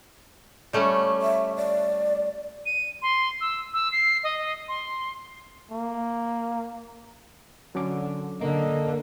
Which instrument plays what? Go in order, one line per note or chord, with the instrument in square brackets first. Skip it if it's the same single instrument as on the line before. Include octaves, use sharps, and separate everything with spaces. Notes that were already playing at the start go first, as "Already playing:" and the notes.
[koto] G3 A3 C#4
[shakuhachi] E5
D5
[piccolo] D#7
C6
E6
E6
C7
D#5
C6
[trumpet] A#3
[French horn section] D3 [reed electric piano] F#3 C#4 D6
[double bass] D3 [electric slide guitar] A#3 [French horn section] A4 D#5